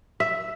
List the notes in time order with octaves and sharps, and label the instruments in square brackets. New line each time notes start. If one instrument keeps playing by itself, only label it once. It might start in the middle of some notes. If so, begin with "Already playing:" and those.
[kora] E5